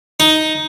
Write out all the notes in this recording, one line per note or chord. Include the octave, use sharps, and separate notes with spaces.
D#4